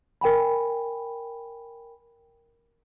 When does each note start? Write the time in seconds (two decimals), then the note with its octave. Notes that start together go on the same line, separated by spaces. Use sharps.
0.21 A#4 G5 G#5 B5